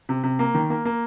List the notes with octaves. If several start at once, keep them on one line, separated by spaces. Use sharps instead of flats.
C3
C3
A#3
D#3
A#3
A#3